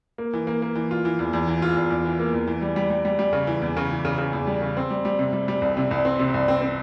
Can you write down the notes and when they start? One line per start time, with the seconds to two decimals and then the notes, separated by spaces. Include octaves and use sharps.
0.18 A#3
0.34 E3
0.47 A#3
0.62 A#3
0.75 E3
0.91 F4
1.05 E3
1.19 E2
1.33 E2
1.48 E3
1.62 F4
1.77 E2
1.90 E2
2.05 E3
2.19 A#3
2.34 E2
2.47 E3
2.61 G3
2.76 G3
2.90 G3
3.05 G3
3.19 G3
3.33 C#3
3.47 E3
3.62 E2
3.77 C#3
3.91 E3
4.05 C#3
4.18 C#3
4.33 E2
4.47 G3
4.62 C#3
4.77 C4
4.90 G3
5.05 G3
5.19 C3
5.33 G3
5.48 G3
5.61 C2
5.77 C3
5.91 C2
6.05 C4
6.19 C3
6.34 C2
6.48 C4
6.61 C4